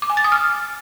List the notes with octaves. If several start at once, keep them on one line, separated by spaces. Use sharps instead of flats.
D6
G#5
A6
D#6
F6